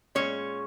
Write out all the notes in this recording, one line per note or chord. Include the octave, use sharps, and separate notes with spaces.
A#2 G#3 C#4 C#5